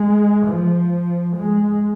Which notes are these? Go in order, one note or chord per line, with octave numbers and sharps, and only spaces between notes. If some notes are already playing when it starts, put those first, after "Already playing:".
Already playing: G#3
F3
G#3